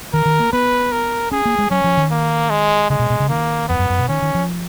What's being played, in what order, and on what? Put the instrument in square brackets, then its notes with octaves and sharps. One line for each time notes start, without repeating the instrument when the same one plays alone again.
[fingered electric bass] D#3 [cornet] A#4
[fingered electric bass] D#3
A#3
[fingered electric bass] B3 [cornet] B4
[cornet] A#4
[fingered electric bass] C#4 [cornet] G#4
[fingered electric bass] A#3
G#3
[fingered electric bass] F#3 [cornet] C#4
[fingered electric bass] F3
D#3
[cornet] A#3
G#3
[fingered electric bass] C#3 [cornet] G#3
[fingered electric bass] B2
B2
C#3
[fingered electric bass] D#3 [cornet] A#3
[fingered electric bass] F2 [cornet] B3
[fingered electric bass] F#2
F#2
B2
[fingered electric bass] D#3 [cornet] C#4
[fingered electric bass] D#3
F3